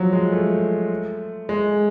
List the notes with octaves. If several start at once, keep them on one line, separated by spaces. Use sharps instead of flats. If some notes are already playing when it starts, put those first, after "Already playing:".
Already playing: F3 F#3
G#3
A3
G#3